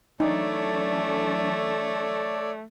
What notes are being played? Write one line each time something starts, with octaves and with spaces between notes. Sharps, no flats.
E3 F#3 A3 D4 D#4 A4 C#5 D5